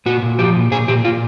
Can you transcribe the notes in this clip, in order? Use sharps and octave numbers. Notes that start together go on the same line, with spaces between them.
A#2 F#4
A#2
F3 G4
A#2
A#2 G#4
A#2 G4
A#2 F4